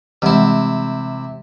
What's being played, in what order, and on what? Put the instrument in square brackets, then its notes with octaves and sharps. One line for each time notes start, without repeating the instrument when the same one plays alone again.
[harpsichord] C3 E4 [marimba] E3 G3 G#3